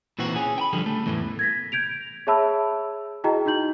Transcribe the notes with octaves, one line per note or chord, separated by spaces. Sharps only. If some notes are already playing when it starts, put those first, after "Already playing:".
A#2 E3 C4 F#4
C#4 G#4
G5 B5
D3 F3 G3
A3
E2 A2 E3
G#6 A#6 B6
G6 G#6 D7 F7
G#4 C#5 E5 A5 B5 E6
E4 F#4 G#4 D#5 G5 A#5
D#4 F#4 G6 F#7